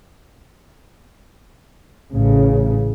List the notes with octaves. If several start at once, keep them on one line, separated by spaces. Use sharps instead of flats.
A1 C#3